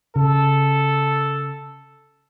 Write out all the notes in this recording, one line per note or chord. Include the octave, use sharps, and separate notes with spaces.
C#3 A4